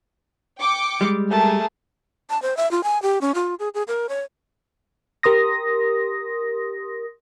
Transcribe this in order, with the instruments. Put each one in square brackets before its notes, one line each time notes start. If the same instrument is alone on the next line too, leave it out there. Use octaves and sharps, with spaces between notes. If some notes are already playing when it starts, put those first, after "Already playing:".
[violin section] G5 D6 C#7
[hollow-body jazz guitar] G3 G#3
[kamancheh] A3 A5 [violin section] G#4 A#4
[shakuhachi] A5
C5
E5
F4
G#5
G4
C#4
F4
G#4
G#4
A#4
C#5
[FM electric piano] G4 A#4 C6 D#6 A#6